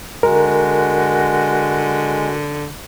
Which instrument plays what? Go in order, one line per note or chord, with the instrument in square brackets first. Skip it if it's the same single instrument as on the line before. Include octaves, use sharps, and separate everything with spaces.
[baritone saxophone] D3 [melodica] G#3 [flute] F#4 [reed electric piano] A#4